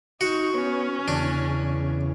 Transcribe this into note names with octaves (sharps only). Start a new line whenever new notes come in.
D#4 F#4 C#6
B3 C#4 C#5
E2 C#3 D4